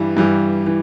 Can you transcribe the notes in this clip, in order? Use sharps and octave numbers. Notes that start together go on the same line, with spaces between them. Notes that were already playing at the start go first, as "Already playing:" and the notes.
Already playing: G2 E3 G3
G2 E3 G3
E3